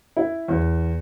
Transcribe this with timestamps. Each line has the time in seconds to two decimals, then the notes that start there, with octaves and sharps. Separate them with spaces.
0.17 E4
0.48 E2